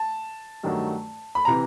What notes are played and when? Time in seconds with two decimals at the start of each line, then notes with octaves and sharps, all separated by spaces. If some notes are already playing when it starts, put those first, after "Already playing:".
Already playing: A5
0.63 G2 D#3 F#3 A3
1.35 B5
1.45 C3 E3 A#5